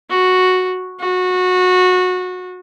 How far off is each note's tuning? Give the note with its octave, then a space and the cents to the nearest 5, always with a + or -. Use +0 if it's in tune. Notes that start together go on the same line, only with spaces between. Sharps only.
F#4 -5
F#4 -20